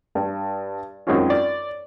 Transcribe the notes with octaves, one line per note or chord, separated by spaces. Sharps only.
G2
F#2 D#3 G#3 C4 C#4 F4
D5